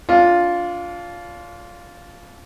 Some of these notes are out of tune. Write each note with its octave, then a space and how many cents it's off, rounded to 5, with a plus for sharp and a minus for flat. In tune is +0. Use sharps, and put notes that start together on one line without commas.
D4 -40 F4 +0